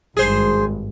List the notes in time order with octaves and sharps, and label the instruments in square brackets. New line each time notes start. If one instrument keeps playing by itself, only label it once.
[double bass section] G#1 G2 [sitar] G#4 C5